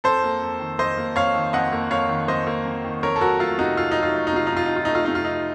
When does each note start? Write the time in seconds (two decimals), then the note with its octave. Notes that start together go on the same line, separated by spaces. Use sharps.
0.04 F2 A4 C5
0.23 A#3
0.42 F2
0.60 D#3
0.79 F2 C5 D#5
0.97 A#3
1.16 F2 C#5 F5
1.35 D#3
1.53 F2 D#5 F#5
1.72 A#3
1.91 F2 C#5 F5
2.09 D#3
2.28 F2 C5 D#5
2.47 A#3
2.65 F2
2.85 D#3
3.03 F2 A#4 C#5
3.16 A4
3.21 F#3 F#4 A#4
3.40 A3 F4 A4
3.58 C3 D#4 F#4
3.77 F2 F4
3.91 F#3 D#4
4.03 F4
4.15 A3
4.27 D#4
4.33 C3 F4
4.47 D#4
4.52 F2 F4
4.66 F#3 D#4
4.76 F4
4.85 A3 D#4
4.95 F4
5.05 C3 D#4
5.15 F4
5.25 F2 D#4